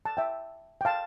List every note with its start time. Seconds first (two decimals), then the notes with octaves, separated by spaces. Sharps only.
0.05 A5
0.17 E5 G5
0.81 G5
0.85 F5 A5